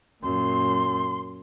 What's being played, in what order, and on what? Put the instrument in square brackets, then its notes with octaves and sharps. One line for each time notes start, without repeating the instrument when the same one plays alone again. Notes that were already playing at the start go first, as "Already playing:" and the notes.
[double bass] F#2 A#2 [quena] C6